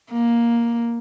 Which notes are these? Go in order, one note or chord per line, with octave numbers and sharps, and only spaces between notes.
A#3